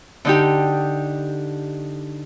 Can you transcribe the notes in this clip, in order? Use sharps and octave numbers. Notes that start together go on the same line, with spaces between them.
D3 D#4 G4